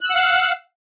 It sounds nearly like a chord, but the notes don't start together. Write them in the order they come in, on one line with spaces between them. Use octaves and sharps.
F#6 E6 F#5 F5